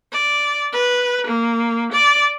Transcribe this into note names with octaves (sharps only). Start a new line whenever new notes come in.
D5
B4
A#3
D5